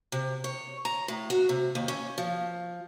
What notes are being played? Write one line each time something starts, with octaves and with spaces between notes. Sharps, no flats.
C3
C#5
A#5
A2
F#4
C3
D#2
C#4
F3